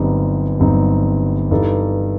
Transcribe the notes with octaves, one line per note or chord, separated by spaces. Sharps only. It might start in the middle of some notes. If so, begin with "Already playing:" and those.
Already playing: G1 G2 F#3 C4 D#4
G1 G2 F#3 C4 D#4
G2 E3 G3 D#4 A4